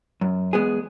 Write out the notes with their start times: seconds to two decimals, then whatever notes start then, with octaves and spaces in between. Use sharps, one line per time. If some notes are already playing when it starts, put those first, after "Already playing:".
0.21 F#2
0.53 E2 G#3 B3 G#4